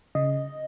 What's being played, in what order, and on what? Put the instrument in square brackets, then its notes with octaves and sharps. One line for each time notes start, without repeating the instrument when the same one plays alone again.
[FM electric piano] C#3 D#5